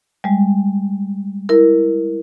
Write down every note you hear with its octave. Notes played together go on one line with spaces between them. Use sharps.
G3 G#3
E4 A#4